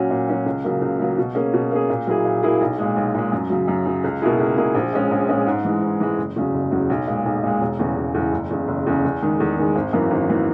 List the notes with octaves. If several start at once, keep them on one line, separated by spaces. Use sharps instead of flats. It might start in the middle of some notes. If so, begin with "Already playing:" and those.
Already playing: A#2 F#3 C#4 F#4
A#2
F#3 C#4 F#4
C#2
C#3 F#3 A#3
C#2
C#3 F#3 A#3
B2
A#3 C#4 G#4
B2
A#3 C#4 G#4
A#2
F#3 A#3 E4 G#4
A#2
F#3 A#3 E4 G#4
B1
A#2 G#3
B1
A#2 G#3
F#2
C#3 F#3
F#2
C#3 F#3
C#2
B2 A#3 E4 G#4
C#2
B2 A#3 E4 G#4
A#1
A#2 G#3 C#4
A#1
A#2 G#3 C#4
G#2
E3 G#3
G#2
E3 G#3
F#1
E2 C#3 F#3
F#1
E2 C#3 F#3
B1
A#2 G#3
B1
A#2 G#3
E1
E2 C#3 E3
E1
E2 C#3 E3
F#1
E2 C#3
F#1
E2 C#3
E2
D#3 G#3
E2
D#3 G#3
G#1
F#2 E3 A#3
G#1
E3 A#3